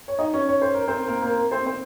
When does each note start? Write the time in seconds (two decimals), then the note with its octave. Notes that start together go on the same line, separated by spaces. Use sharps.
0.08 C#5
0.19 D#4 D#5
0.33 C#4 C#5
0.49 C#5
0.62 C5
0.74 A#4
0.88 C4 C5
1.08 A#3 A#4
1.22 A#3 A#4
1.52 C4 C5
1.66 C4 C5